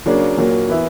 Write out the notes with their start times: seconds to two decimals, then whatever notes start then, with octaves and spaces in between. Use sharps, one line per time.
0.06 C#3 F#3 A#3 D4
0.37 A#2 F#3 A#3
0.68 E3 B3 E4